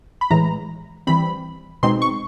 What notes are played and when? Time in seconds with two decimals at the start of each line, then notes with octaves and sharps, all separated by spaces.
0.21 B5
0.30 A2 E3 G#3 A#5
1.07 E3 G3 C4 B5
1.83 B2 G#3 C4 D#4 C6
2.02 C#6